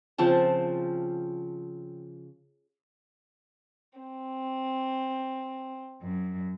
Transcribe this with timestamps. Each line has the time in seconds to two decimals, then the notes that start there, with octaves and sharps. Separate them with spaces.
0.18 C#3 F3 C4 A5
4.00 C4
6.03 F#2